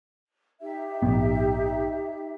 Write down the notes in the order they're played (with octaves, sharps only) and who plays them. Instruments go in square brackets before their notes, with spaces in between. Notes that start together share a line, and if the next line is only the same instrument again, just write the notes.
[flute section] D#4 G4 E5
[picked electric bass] A#1 G#2 B3